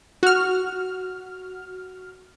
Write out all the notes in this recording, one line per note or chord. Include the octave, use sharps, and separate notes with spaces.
F#4 F6